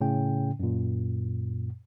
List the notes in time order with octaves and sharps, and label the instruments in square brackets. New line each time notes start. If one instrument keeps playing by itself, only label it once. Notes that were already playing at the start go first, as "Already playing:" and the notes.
[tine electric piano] A2 C#3 C#4 G5
F#2 A#2